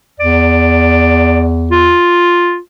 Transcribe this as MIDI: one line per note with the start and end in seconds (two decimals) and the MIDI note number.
0.20 1.94 40
0.20 1.47 74
1.72 2.59 65